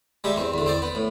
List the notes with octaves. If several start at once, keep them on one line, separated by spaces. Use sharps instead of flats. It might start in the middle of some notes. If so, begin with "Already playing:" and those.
G3 G#3 G4 E5
E2 C4
E2 D3
C4 C5 D5
B3
A2